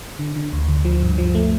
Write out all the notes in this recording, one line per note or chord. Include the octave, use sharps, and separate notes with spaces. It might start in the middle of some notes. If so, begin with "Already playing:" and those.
D3
D3
D2
D2
F3
G2
F3
A3